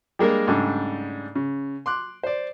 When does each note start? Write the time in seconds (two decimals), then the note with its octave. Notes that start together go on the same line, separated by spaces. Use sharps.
0.19 G3 G#3 A#3 D4 A#4
0.48 G#2 C#3 G3 A3 D4
1.35 C#3
1.86 C6 D6 F#6
2.24 C5 D5